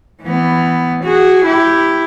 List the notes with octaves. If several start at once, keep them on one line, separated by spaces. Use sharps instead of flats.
E3 B3
F#4 G#4
E4 G4